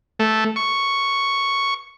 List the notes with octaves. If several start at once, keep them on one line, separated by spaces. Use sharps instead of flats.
A3
C#6